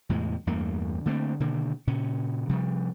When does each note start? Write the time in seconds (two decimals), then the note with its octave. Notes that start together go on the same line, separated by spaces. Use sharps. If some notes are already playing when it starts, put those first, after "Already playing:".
0.09 E2 A2 C3 G#3
0.47 E2 G2 A3 A#3
1.06 D3 A3 A#3 C4
1.40 B2 D3 D#3 A#3
1.87 A#2 C#3 C#4
2.49 C3 F3 G3